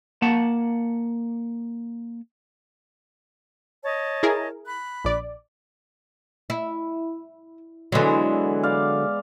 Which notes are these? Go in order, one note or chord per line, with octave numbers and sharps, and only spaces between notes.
A#3 F#5 A5
C#5 D#5 A5
E4 G#4 A#4
B5 F#6
A#1 D5
E4
D3 E3 F#3 G#3 B3
D5 F5